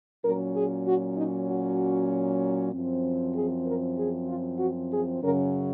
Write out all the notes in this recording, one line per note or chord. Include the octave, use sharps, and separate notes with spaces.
A#2 F#3 C#4 A#4
G#4
F#4
D#4
F#4
F#2 F3 C4
G#4
A#4
G#4
F4
F#4
G#4
F#2 C#3 F#3 C#4 A#4